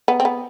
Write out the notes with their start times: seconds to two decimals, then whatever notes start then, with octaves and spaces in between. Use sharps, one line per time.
0.08 B3
0.20 C4
0.25 B3